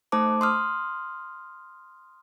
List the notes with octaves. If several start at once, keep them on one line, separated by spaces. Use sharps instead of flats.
A3 D#4 C5 A5 D6
C6 D#6 F6